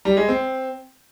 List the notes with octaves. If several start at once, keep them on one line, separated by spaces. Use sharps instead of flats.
G3
G#3
C4